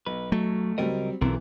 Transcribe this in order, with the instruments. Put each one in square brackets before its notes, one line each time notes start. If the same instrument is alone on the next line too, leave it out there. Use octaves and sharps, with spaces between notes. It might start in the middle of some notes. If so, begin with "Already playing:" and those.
[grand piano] B1 [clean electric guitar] B4
[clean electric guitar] F#3 [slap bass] A3
[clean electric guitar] C#2 A#4 D#5 [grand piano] F#3 G3 C4
[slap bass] B1 [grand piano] C3 E3 [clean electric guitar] C4 A4 A#4